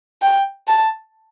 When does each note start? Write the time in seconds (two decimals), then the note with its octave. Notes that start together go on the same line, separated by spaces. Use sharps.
0.22 G5
0.68 A5